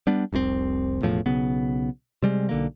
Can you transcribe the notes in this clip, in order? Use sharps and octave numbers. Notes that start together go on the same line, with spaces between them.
G3 B3 D4
F1 C2 G#2 C4
E1 E2 A2 F3
B1 C#3 B3
C3 G3 G#3
B1 D3 A#3